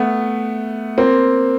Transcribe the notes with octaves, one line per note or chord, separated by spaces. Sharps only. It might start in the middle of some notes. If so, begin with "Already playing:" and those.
Already playing: A3 B3
A#3 C4